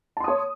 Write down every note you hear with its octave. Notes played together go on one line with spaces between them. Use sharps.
C#5 A5 C6 D#6